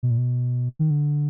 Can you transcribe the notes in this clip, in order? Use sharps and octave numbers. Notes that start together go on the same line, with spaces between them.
B2
A#2
B2
D#3
D3